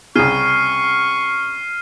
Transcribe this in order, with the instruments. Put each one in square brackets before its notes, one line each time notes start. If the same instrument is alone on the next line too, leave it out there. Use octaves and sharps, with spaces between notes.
[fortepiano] C2 C#3 [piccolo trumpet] C#6 [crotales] F6 C7 D#7